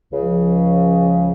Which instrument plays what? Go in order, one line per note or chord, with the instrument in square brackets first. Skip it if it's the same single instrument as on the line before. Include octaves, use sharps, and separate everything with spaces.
[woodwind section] C#2 C#3 F3